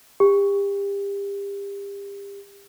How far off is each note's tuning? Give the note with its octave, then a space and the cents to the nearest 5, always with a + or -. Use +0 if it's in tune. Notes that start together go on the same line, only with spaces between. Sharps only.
G4 +30